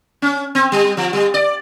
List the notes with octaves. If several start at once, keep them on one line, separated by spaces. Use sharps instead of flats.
C#4
C4
G3
F3
G3
D5